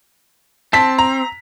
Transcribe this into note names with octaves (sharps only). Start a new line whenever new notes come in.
C4 A5 B6
A#5